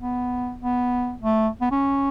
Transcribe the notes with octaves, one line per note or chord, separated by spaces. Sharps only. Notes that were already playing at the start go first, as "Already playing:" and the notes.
B3
B3
A3
B3
C#4